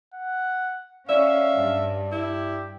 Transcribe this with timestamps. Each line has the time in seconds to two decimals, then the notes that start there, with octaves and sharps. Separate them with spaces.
0.14 F#5
1.09 C#4 D5 E5 F5
1.58 G2
2.12 E4 G4